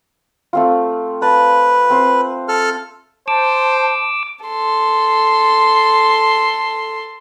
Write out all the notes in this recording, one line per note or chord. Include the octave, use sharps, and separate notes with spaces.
A3 C4 F4
B4 A5
C4 C5
A4 F6
C5 A5 D6 E6
A4 C6